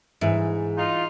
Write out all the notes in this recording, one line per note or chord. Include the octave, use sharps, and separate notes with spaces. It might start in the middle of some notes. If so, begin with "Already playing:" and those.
G#2 E3 E5
D#4 F4